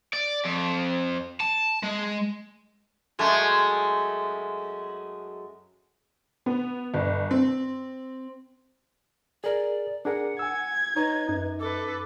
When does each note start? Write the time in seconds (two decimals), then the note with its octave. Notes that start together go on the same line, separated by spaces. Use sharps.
0.13 D5
0.45 F2
1.40 A5
1.83 G#3
3.19 F#2 G#3 A3
6.46 B3
6.94 G1
7.31 C4
9.44 G#4 A#4 D5
10.05 D4 G#4 A#4 F#5
10.39 G#5 E6 G#6
10.96 D#4 B4 C#5
11.29 F#2 D#4
11.60 A4 B4 D6